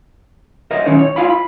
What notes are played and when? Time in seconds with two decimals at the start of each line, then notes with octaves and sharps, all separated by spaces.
0.71 A#4 C5 D#5 E5
0.85 D#3 C#4 D#4 E4 C5
0.99 C#5
1.16 E4 F4 F5 G#5 B5
1.30 B5